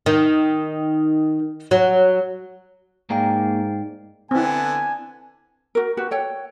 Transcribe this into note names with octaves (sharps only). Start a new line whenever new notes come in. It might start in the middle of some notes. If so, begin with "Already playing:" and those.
D#3
F#3
G#2 A#3 G#4 A#4 D5 F5 G5
D3 B3 C4 E4 G#5 A5
F#4 A#4
F#4 G4 B4
A4 C#5 G5